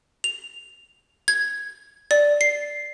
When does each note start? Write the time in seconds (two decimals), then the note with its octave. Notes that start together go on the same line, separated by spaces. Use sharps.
0.24 F7
1.28 G#6
2.11 D5
2.41 C7